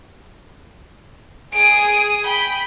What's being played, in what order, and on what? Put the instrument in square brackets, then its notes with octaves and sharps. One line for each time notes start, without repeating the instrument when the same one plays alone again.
[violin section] G#4 D#6 [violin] D7
[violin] G5 [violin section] B5